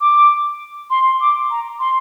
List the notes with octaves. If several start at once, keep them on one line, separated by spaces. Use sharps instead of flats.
D6
C6
D6
A#5
C6